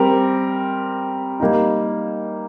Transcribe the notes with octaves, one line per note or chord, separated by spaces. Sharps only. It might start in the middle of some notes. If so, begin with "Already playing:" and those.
Already playing: G3 C4 G4 A#4
G3 A#3 D#4